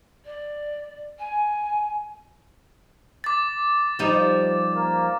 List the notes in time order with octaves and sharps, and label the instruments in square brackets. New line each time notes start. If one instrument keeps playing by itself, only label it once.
[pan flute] D5
G#5
[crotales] D6 A6
[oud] F3 G3 D#4
[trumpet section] A#3